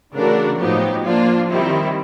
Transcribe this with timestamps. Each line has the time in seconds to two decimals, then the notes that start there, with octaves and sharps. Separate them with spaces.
0.14 C#3 E3 A3 D4 F#4 A#4
0.59 A2 F3 F#3 B3 D#4 G4
1.04 F3 A#3 D4 F4
1.49 D#3 G3 C4 E4